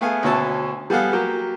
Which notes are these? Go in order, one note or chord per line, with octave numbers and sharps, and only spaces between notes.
A3 B3 G#4 F5 G#5
D2 B2 C#4 E5 A5
G3 B3 G#4 A4 F5 F#5
F#3 A#3 G4